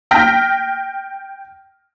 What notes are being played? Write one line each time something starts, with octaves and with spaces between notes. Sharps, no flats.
G5 F6 A#6 B6